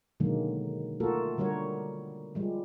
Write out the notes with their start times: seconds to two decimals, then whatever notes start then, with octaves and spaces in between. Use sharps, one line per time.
0.20 B2 D3 D#3 F#3 G#3 A#3
1.00 A3 A#3 F4 F#4 A4 A#4
1.38 D3 G3 F#4 A#4 C#5
2.35 F3 G3 G#3